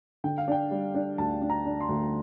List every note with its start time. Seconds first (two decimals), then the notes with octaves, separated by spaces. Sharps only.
0.24 D3 G5
0.38 F5
0.48 D4 G5
0.71 G3
0.94 D4
1.18 D2 A5
1.42 D4
1.50 A#5
1.65 D4
1.80 C6
1.89 D2